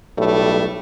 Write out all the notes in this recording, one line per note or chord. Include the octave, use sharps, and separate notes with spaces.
B1 A2 G3 A3